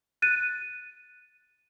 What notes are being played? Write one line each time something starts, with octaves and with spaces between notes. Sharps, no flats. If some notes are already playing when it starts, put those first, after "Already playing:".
F#6 A6 D#7